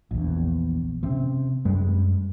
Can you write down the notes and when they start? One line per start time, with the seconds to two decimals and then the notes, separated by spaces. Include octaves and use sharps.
0.11 A#1 E2
1.03 C3 C4 C#4
1.65 F#2 G3 G#3